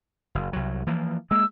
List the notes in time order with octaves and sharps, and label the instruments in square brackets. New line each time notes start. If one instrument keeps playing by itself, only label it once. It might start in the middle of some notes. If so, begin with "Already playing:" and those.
[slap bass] F#1
C2 F#3
E3 F3 A#3
[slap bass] G#3 A#3 [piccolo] E6